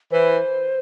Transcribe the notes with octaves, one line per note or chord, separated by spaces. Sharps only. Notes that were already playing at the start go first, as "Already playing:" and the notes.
E3 C5